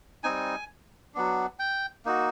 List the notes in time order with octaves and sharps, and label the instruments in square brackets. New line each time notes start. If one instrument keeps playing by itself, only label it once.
[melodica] G3 C4 D#4 G#5
F#3 B3 D4
G5
A#3 D#4 F#4